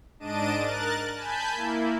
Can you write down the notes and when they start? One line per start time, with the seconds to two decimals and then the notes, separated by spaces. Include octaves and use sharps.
0.19 G#2 D4 D#5 A5 D7 D#7
0.58 A#4 F#6 A6
1.15 G#5 A5 B5 G6
1.55 A#3 E4